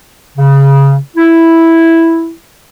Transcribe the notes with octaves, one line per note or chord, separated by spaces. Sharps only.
C#3
E4